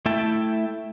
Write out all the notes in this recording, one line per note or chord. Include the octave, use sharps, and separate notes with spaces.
A3 E4 E5 G5 A5